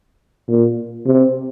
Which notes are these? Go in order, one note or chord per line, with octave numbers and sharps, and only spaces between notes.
A#2
C3